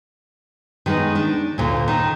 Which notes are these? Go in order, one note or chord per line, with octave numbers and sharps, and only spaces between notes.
D#3 G#3 A#3 B3 D#4
D4
D2 A#2
D#3 D#4